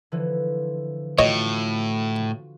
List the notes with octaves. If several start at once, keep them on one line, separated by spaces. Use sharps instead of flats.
D3 E3 F3
A2 F4 F#4 C#5 D#5